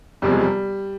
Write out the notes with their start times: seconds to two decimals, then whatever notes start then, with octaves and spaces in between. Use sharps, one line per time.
0.22 E1 E2 C3 F3 G3
0.31 G#3
0.40 G3